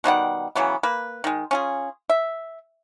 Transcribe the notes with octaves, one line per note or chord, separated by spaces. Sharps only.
B2 D#3 G3 F#5
C#3 E3 F#3 B3
A#3 B4
D#3 G#3
C#4 F4 G#4
E5